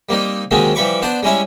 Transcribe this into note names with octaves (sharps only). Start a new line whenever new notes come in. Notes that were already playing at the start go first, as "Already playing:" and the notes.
G3 A#3 C4 D#4
D#2 D#3 F#3 G#3 C4 C#4
E3 F3 G3 B5 C#6 D6
B3 D4 C5 D5
G3 G#3 C#4 E4 C#5